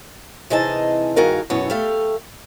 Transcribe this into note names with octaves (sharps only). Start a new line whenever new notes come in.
C3 E3 D#4 G#4 D#5 A5
G2 D#3 F#4 G#4 A#4 F5
F#2 B2 E3 B3 C#5
A3 G4 F5